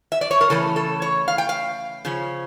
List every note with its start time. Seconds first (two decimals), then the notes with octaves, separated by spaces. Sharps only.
0.12 E5
0.21 D5
0.31 C#5
0.41 A#4
0.50 C#3 E3 A3 C#4 A4
0.76 A4
1.02 C#5
1.28 F5
1.38 G5
1.49 F5
2.05 C#3 F3 C#4